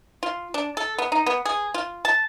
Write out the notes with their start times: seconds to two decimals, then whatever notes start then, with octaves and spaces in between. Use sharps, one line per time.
0.23 F4
0.54 D4
0.77 A4
0.98 B3
1.12 D#4
1.26 B3
1.45 G#4
1.74 F4
2.05 A5